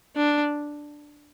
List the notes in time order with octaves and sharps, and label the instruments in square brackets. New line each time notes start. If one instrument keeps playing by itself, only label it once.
[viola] D4